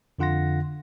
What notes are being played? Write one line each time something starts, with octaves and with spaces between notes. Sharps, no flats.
F2 D3 F4 F#5 C6 A#6